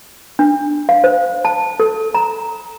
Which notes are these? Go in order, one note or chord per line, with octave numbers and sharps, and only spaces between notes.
D4
F5
C5
A5
A4
A#5